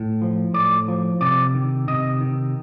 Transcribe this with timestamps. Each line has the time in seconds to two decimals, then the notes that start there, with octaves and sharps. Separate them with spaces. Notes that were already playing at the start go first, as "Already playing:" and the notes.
Already playing: A2
0.22 F3
0.54 A2 D5
0.88 F3
1.21 C3 D5
1.55 D#3
1.88 C3 D#5
2.21 D#3